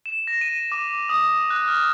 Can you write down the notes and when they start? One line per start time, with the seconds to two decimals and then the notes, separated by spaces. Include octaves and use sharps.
0.06 E7
0.27 A#6
0.41 D#7
0.72 D6
1.09 D#6
1.50 F#6
1.68 F6